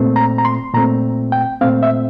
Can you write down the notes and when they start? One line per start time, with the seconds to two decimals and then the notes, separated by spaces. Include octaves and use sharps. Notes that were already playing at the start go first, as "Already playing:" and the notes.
Already playing: A#2 A3 C4
0.16 A#5
0.38 A#5
0.45 C6
0.74 A#2 A3 C4 A#5
1.32 G5
1.61 A#2 A3 C4 F5
1.83 E5